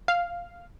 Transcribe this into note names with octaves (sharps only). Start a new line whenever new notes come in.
F5